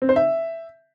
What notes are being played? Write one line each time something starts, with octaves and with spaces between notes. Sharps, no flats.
C4
C5
E5